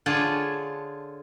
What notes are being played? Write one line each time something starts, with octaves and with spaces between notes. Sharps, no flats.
D3 F4 G#4 C#5 A5